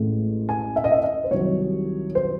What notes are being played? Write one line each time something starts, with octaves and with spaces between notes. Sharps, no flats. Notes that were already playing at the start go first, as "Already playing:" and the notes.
Already playing: A1 A2 G#3
G#5
E5
D#5
E5
D#5
C5
C2 C3 D#3 F#3 C#5
C5